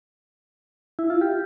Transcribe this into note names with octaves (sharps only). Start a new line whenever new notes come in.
E4
F4
G4